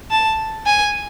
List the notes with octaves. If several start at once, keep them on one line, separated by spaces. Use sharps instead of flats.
A5
G#5